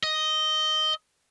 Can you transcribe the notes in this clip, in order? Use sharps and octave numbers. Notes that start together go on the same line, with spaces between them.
D#5